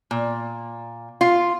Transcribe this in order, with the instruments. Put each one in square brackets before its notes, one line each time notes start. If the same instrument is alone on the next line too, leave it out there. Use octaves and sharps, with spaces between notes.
[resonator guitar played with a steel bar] A#2
F4